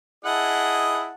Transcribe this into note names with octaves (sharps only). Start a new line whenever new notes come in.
E4 G#4 D#5 F#5 A5